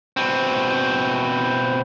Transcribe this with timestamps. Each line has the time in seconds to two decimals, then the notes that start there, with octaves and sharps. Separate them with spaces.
0.17 B2 C4